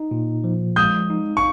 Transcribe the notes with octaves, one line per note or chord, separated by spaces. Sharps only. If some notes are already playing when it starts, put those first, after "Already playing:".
Already playing: D#4
A#2
F3
G#3 D#6 G6
D#4
C#6